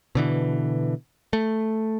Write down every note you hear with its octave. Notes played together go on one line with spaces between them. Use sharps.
B2 D3 E3
A3